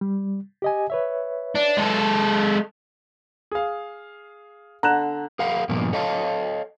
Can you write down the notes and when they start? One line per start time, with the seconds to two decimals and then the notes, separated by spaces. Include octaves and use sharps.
0.01 G3
0.62 G4 D#5 G#5
0.90 B4 C#5 E5
1.55 D4
1.77 G#3 A4
3.52 G#4 F5
4.83 D3 A#5 F#6 E7
5.39 G#4 A#4 F5 F#5
5.69 G2 A#2 F3 A#3 B3
5.93 A4 C#5 D#5 F5 A5